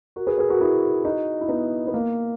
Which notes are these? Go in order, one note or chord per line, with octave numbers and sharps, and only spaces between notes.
F#4 A#4
G#4 B4
G#4 B4
F#4 A#4
E4 G#4
D#4 F#4
E4
B3 D#4
B3
A#3